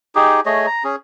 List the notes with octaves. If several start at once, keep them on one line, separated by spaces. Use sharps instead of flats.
D#4 G4 G#4
A3 G#4 C#5 D#5
A#5
C#4 G#4